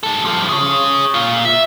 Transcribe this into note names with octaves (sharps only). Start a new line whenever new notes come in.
G#3 A4
G2 F3
G#4 C#5
A#2 F4
E5